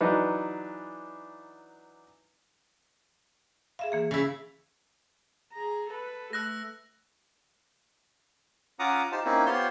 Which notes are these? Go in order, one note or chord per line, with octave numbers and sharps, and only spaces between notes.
E3 F#3 D4 D#4 B4
G#4 E5 F5
E3 A#3 G#4
C#3 E4
G#4 A#5
A4 B4
A3 E6 F#6 A#6
C#4 F4 F#5 A#5 D6 D#6
D#4 F4 G4 C5 A5
A#3 C4 C#4 D#4 E4
B3 F4 G4 C5 C#5 C6